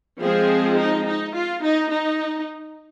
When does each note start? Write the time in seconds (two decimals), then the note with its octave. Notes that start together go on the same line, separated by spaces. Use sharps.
0.22 F3 G#3 C4 G#4
0.77 D#4
1.06 D#4
1.34 F4
1.63 D#4
1.91 D#4